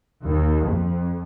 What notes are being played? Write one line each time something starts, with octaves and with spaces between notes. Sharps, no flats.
D#2
F2